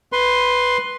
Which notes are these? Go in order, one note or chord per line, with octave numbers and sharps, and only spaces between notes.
B4 C6